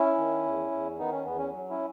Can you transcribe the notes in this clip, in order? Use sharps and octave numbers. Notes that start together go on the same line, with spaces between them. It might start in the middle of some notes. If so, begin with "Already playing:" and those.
Already playing: C#4 E4
D#3
E2
E2
D#3 B3 D#4
C#4
E2 B3
C#4
F#3
C#4 E4